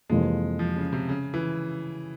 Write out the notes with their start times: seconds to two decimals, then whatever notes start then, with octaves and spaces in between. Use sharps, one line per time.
0.10 F2 C3 E3 G#3 A#3
0.59 F3
0.76 C#3
0.93 C3
1.09 C#3
1.34 E3